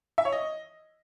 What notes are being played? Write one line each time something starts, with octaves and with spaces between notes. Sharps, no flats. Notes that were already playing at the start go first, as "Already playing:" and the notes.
E5
C#5
D#5